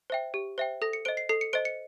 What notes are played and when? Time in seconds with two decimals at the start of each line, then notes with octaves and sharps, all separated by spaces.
0.10 C5 E5 G5
0.34 G4
0.58 C5 E5 G5
0.82 A4 A#6
0.93 C#7
1.05 C5 D#5 D7
1.17 C7
1.29 A4 C7
1.41 C#7
1.53 C5 D#5 D7
1.65 C#7